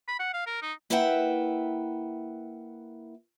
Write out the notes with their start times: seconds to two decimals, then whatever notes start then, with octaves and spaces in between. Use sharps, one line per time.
0.08 B5
0.19 F#5
0.34 F5
0.47 A#4
0.62 D#4
0.90 A#3 E4 B4 E5 F#5 G5